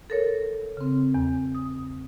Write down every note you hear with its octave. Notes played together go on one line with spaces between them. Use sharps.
A4 A#4 C#5
C#3 C4
E2
D#6